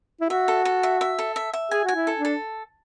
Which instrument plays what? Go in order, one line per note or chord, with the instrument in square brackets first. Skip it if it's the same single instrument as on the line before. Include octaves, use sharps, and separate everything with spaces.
[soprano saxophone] E4
[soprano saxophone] F#4 [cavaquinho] E5
[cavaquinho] A4
A4
E5
E5
A4
E5
E5
[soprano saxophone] G#4 [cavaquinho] G#5
[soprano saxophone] F#4 [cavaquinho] G#5
[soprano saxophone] E4
[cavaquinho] A4
[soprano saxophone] D4
[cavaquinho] A4